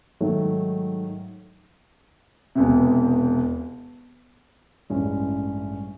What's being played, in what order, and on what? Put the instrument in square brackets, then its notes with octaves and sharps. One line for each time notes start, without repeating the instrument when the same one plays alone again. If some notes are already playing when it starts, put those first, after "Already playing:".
[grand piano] G#2 D#3 F#3 A3
E1 E2 C3
A1 G2 E3 G#3 C#4